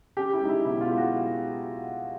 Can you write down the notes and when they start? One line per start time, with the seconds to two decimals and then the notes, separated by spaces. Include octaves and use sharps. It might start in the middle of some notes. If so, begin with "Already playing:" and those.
0.17 C#4 G4
0.33 E4
0.41 G#3 D#4
0.49 E4
0.65 B2 E4
0.81 F4
0.89 G#3
0.97 F#4